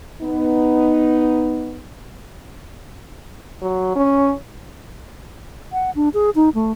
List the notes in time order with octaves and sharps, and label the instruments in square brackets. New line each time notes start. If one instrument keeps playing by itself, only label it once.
[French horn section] B3 D#4
[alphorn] F#3
C#4
[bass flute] F#5
D4
G#4
D#4
A3